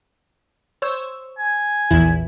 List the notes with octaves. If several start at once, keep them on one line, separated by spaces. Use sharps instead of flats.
C5 C#5 E6
G#5
A#1 E2 E4